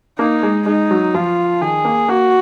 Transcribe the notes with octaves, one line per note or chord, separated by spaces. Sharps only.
A#3 D#4
G#3
G#3 D#4
F#3
F3 F4
D#3 G#4
A#3
A#3 F#4